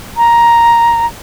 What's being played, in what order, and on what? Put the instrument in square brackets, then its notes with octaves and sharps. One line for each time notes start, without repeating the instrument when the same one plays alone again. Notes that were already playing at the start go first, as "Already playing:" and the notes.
[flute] A#5